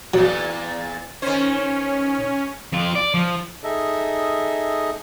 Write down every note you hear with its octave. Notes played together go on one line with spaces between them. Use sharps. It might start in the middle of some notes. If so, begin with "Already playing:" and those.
E2 A#2 F#3
D#3 C#4 C5
F2 F4
D5
F3
D#4 G#4 A4 D#5 E5